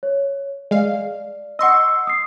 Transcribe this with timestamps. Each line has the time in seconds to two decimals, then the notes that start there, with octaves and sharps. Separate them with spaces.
0.03 C#5
0.71 G#3 D5 F5
1.59 D#5 F#5 C6 C#6 E6
2.07 D#6 C7